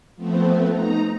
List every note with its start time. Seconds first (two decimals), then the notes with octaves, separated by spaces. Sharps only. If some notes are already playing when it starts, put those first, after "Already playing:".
0.16 F3 A3 B3 C4
0.70 D#4 A#5